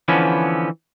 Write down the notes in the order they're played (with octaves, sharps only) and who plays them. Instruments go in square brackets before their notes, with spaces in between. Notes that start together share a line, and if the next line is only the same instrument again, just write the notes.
[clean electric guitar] D3 E3 F3 B3 C#4